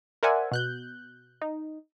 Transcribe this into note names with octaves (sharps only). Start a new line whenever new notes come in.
A#4 C5 D5 E5 F#5 G#5
B2 F#6 G6
D#4